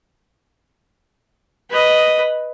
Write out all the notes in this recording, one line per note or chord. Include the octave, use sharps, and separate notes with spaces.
B4 D#5